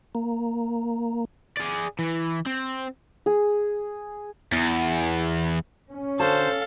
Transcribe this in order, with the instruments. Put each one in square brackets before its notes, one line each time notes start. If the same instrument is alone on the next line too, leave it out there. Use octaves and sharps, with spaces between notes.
[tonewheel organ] A#3
[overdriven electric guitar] G#4 D5
E3
C4
[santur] G#4
[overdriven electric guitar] E2
[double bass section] C#4
[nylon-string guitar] D3 F#4 A5 [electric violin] A4 F5 [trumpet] C5